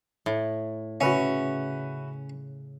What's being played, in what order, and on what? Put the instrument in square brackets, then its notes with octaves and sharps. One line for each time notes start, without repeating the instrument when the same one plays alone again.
[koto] A2
[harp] C#3 [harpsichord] C#4 [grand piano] F#4 B4 E5